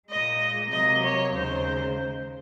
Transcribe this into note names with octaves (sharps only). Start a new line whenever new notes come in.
A#2 G#3 D#5
C3 F#3 A#3 D#5
C#5
D#2 C#3 G#3 C5